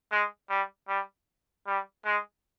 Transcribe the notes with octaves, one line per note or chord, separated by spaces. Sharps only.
G#3
G3
G3
G3
G#3